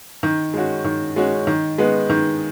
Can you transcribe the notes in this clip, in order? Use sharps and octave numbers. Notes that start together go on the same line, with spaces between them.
D#3
G#3 C#4 F#4
D#3
G#3 C#4 F#4
D#3
G#3 B3
D#3